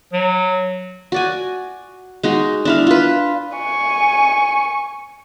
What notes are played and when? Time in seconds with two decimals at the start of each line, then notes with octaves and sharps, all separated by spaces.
0.13 F#3
1.12 F#4 D5 G#5
2.23 G#3 D#4 F#4
2.65 D4 E4 F5
2.87 F4 B4
3.55 G#5 C#6